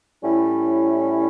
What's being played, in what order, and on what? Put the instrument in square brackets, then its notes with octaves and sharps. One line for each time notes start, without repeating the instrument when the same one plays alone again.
[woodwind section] A2 G3 C#4 E4